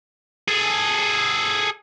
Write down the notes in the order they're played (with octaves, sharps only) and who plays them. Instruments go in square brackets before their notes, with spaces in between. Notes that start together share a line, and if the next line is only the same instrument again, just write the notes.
[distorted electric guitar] G#4 A4